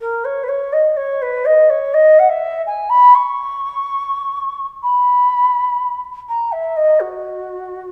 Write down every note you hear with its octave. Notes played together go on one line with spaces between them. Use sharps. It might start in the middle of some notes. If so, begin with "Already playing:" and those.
A#4
C#5
B4
C#5
D#5
C#5
B4
D#5
C#5
D#5
F#5
E5
G#5
B5
C#6
B5
A#5
E5
D#5
F#4